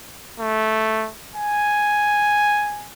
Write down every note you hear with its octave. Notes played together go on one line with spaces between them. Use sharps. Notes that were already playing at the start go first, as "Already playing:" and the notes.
A3
G#5